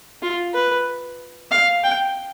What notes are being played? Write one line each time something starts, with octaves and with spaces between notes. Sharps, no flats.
F4
B4
F5
G5